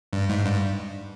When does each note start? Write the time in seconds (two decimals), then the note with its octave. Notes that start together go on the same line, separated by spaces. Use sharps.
0.13 G2
0.29 G#2
0.45 G2